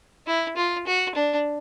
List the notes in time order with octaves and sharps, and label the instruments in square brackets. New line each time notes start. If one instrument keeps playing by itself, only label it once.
[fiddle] E4
F4
F#4
D4